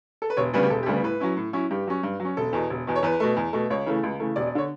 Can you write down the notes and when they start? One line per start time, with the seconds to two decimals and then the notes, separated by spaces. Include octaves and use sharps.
0.22 A4
0.30 B4
0.37 E1 C#5
0.53 D2 C#3 G3 B3 B4
0.63 G4
0.70 E1 A4
0.83 G4
0.86 D2 C#3 G3 B3 A4
1.03 A2 B4
1.20 F#3 C#4 E4
1.37 A2
1.53 F#3 C#4 E4
1.71 G2 G4
1.87 F#3 C#4
2.03 G2
2.20 F#3 C#4
2.37 E1 A4
2.53 E2 B2
2.70 E1
2.87 E2 B2
2.95 C#5
3.03 E2 B4
3.20 B2 A3
3.37 E2
3.53 B2 A3
3.70 C#2 C#5
3.86 C#3 E3 A3
4.03 C#2
4.20 C#3 E3 A3
4.36 E1 D5
4.47 D5
4.55 D3 C#5